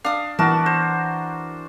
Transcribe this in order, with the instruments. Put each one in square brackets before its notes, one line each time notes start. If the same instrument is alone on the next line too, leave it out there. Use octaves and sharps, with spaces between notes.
[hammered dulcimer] D4 [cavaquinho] F5 D#6
[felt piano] E3 [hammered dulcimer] B3 F#4 A#4 [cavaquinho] A5
[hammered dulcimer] C5